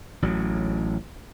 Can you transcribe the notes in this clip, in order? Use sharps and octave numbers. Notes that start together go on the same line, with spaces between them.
A1 F#3